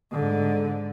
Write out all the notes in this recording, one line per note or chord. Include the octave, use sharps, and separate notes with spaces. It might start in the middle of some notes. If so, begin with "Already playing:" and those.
G#2 D3